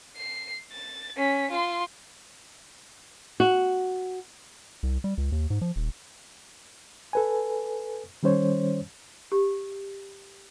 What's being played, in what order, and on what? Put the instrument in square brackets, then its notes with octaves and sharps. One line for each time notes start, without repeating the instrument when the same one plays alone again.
[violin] C7
A6
C#4 B6
F4 C6
[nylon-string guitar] F#4
[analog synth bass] C2
G3
C#2
D#2
G#2
F3
D#1
[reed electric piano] A4 B4 G#5
D#3 G3 C#4 C5 C#5
[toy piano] G4